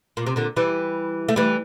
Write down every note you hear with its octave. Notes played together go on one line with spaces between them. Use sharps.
A#2
C3
A#2 D3
E3 G3
A3
E3 G3